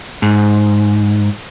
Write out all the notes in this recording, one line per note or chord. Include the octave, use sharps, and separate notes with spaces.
G#2